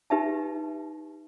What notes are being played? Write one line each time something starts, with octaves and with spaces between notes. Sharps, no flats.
D#4 G4 B4 E5 A5